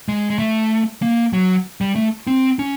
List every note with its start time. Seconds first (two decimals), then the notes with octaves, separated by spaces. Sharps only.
0.08 G#3
0.30 G#3
0.39 A3
1.02 A#3
1.33 F#3
1.81 G3
1.95 A3
2.27 C4
2.59 C#4